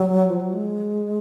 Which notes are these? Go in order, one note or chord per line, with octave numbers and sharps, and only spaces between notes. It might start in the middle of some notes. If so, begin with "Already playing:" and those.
Already playing: F#3
F3
F#3
G#3